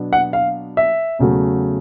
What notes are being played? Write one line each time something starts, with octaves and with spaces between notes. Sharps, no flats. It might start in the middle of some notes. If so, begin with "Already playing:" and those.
Already playing: B2 F#3 B3 D4
F#5
F5
E5
E2 C#3 F#3 A3